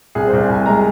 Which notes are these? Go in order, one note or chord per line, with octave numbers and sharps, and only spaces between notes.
C2 G#4
C5
C2
C2 G#5
G#3 A#5